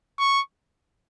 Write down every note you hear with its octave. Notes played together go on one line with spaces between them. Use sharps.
C#6